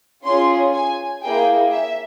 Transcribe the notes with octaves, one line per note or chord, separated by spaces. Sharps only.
C#4 F4 G#4 C6
G#5
A#3 E4 G#4 G5
E5